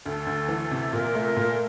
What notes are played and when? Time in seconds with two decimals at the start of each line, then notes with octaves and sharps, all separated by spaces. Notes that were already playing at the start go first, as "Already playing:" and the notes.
0.06 D2 A4
0.27 D2
0.48 E3
0.71 C3
0.93 A#2 A#4
1.15 A3
1.36 A#2